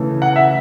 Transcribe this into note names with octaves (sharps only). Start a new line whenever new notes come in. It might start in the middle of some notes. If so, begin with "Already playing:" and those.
Already playing: C#3 E3 A3
F#5
E5